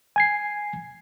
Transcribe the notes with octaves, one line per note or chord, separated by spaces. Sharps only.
G#5 G#6 C7